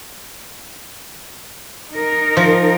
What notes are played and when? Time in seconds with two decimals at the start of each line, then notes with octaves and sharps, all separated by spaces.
1.90 D#4 A#4
2.37 F3